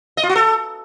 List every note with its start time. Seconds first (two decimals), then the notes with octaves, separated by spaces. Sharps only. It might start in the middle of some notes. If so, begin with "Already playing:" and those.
0.17 D#5
0.23 F4
0.29 F#4
0.36 A4